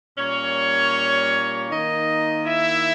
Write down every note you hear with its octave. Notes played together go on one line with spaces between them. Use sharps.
A#2 G3 A#3 C#4 C#5
D#3 A#3 D#4 D#5
E4 E5